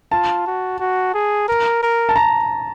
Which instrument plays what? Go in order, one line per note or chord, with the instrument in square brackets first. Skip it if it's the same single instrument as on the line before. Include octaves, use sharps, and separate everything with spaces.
[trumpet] F4 [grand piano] A5
[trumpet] F#4
F#4
G#4
A#4
A#4
[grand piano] A5
A#5